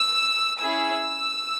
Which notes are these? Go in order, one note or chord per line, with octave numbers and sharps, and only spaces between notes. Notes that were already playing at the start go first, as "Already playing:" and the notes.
Already playing: E6
C#4 E4 G#4 E6